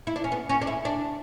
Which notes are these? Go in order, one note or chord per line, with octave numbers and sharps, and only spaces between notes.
E4
D4
C#4
B3
C#4
D4
E4
D4